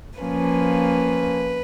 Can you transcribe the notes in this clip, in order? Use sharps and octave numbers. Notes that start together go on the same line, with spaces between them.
F3 A#3 C#4 B4